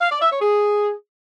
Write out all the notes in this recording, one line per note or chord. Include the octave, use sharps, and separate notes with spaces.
F5
D5
E5
C#5
G#4